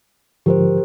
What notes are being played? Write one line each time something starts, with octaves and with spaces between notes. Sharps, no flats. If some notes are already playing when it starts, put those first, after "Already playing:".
G#2 D3 F3 G4 A#4 C5